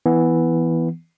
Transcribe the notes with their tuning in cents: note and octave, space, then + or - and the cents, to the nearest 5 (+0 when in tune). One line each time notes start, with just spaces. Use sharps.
E3 +0 B3 +0